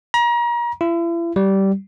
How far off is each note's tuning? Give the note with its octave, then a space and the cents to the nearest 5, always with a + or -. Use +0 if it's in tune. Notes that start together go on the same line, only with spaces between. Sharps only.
A#5 +35
E4 +40
G3 -15